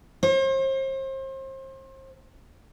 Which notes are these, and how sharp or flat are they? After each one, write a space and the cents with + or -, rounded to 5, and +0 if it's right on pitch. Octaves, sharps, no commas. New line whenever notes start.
C5 +35